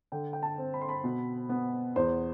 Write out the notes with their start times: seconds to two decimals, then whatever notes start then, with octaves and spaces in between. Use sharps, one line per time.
0.12 D3 G5
0.33 G5
0.43 A5
0.58 C4
0.74 B5
0.81 C6
0.89 B5
1.04 B2
1.49 B3
1.96 E2 C5